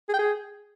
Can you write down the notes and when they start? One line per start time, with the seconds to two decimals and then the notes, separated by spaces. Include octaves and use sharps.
0.09 G#4
0.14 G5
0.19 G#4